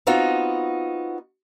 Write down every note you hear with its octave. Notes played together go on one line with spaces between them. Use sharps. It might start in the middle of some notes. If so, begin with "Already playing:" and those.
B3 C4 D#4 F4 F#4